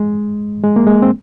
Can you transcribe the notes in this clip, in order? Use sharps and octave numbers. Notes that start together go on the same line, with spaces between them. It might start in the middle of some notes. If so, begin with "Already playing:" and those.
Already playing: G#3
G#3
A#3
G#3
C4